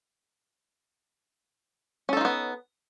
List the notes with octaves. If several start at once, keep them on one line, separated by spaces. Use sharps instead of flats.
B3 C#4 D#4 F4 A4